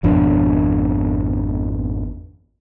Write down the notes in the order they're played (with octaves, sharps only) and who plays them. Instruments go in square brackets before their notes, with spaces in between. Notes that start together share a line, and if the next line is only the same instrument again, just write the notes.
[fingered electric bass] G#1 F2 B2 D4